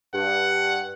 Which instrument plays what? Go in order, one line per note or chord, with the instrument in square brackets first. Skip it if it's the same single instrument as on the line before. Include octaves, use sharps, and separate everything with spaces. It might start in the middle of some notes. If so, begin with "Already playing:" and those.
[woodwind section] G2 [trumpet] F#5